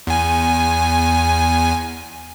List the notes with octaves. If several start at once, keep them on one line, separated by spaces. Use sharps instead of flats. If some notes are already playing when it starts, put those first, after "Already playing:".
E2 G#5